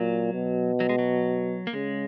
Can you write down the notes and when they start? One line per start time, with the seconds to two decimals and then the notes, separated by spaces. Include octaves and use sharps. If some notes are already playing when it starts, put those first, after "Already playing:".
Already playing: A#2 F#3
0.33 B2
0.80 F#3
0.89 G#3
0.99 F#3
1.67 A#3
1.73 C#3 G#3